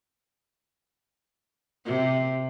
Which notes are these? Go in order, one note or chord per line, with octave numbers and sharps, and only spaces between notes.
C3